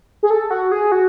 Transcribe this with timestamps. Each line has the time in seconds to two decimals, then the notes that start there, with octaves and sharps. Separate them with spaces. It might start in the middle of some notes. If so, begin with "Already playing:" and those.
0.23 G#4
0.30 A4
0.51 F#4
0.72 G#4
0.92 F#4